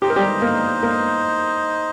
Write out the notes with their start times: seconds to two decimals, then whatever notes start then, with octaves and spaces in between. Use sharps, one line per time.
0.02 D#4 G4 C5 D#5
0.10 A#4
0.16 G3 G4
0.42 A#3 A#4
0.83 A#3 A#4